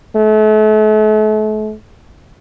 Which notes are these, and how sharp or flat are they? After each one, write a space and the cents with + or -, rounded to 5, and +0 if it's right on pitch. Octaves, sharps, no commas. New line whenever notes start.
A3 -40